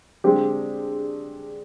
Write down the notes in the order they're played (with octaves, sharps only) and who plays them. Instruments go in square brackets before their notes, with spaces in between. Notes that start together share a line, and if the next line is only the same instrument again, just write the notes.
[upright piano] D3 G#3 C4 G4